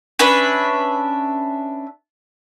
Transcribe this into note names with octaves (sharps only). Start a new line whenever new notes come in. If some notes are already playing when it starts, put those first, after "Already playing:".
C#4 D4 B4 E5